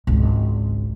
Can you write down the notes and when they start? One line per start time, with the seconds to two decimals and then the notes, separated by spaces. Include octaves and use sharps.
0.07 G#1 C#2